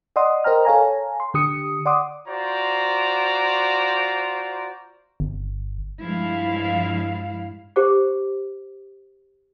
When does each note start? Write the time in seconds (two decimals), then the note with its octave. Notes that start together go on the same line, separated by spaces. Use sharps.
0.16 D5 D#5 F#5 C6 D#6
0.44 A#4 C5 D#5 G5 A#5 F6
0.65 A4 C#5 F5 G#5 A#5
1.20 C6
1.34 D3 G4 D#6 C#7
1.86 D5 F#5 C6 D6 D#6
2.28 F4 F#4 C5 D5 A#5
5.20 G1
6.03 G2 F3 G#3 E4 F5
7.76 G4 C5 D6